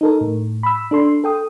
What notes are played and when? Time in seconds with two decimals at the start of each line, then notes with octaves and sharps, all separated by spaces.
0.01 D#4 A4 A#4
0.21 A2
0.63 B5 E6
0.91 D4 A4 C6
1.24 A4 G5 D#6